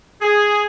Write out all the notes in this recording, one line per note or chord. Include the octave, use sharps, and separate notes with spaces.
G#4